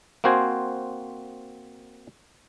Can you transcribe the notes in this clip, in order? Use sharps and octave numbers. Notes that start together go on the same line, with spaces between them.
A#3 C4 F#4 C5 G#5